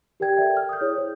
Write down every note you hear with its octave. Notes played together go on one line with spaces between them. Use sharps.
G4 A#4 D5 G5 G#6
A4 A#4 D5 E5 G5
F6
D#6 G6
E4 G#4 C#5 D5
C5